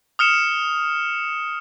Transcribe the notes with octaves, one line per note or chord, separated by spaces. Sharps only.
D#6 F6 C#7 E7